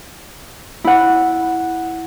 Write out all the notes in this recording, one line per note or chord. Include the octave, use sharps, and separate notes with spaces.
E4 F#5